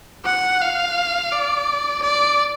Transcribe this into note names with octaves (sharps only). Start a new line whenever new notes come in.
F#5
F5
D5
D5